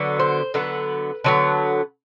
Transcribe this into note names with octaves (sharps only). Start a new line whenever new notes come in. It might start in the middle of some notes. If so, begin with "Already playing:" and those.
Already playing: D3 F#3 B3
C5
D3 F#3 B3 B4
D3 F#3 B3